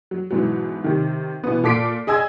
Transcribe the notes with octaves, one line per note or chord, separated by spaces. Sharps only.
F#3
G#2 B2 E3 F#3
C3 D#3
B2 E3 B3
A#2 A4 D6 B6 C7 D7
G#4 D#5 G#5 E6 G#6